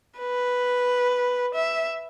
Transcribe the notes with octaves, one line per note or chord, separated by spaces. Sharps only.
B4
E5